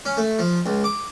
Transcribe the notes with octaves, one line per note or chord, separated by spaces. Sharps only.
C#4
A3
F3
C#2
D6